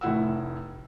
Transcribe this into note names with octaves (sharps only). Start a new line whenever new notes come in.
F1 A2 E4 F#5 E6